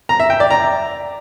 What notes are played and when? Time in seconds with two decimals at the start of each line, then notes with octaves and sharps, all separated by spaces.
0.09 A#5
0.20 E5
0.30 G5
0.40 D5
0.51 A#5